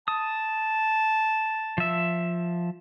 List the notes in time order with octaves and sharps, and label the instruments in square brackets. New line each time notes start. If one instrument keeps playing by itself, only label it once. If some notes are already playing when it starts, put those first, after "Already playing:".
[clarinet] A5 [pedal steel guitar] D#6
[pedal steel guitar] F3 E5